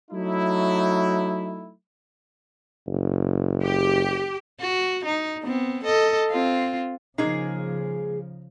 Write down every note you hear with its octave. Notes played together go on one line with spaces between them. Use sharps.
F#3 A3 D#4 E4
F#1
G4
F#4
D#4
B3 C4
A4 D#5
C4 F4
C#3 F3 G#3 A#3 D#4 G#4